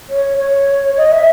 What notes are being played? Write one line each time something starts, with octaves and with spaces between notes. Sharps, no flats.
C#5
C#5
D#5
E5